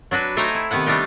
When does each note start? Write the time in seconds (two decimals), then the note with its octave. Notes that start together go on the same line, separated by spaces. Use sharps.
0.11 F#3 D4 F#4 B4
0.37 A3 D#4 C5 G5 G#5 A#5
0.55 E4
0.71 C3 D#3 B3 B4 F#5
0.86 G3 A3 D4 D#4 G4